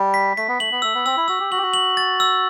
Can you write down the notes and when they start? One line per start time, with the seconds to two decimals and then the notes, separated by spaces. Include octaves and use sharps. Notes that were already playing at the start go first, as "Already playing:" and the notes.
Already playing: G3
0.14 B6
0.37 A3 B6
0.48 B3
0.59 A3 F#7
0.72 B3
0.82 A3 E6
0.95 B3
1.06 C4 E6
1.17 E4
1.28 F#4 E6
1.40 G4
1.51 F#4 F#7
1.58 G4
1.62 F#4
1.74 F#7
1.97 A6
2.20 E6